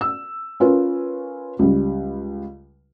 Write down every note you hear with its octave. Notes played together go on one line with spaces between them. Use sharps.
E6
C#4 F4 A#4 B4
C#2 G3